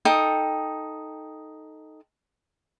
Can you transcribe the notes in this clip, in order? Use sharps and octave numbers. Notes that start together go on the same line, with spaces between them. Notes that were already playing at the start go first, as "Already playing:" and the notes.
D#4 A4 G5 D#6